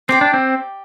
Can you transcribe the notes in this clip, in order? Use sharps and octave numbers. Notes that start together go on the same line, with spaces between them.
C4 G4 D5 G5
D4
C4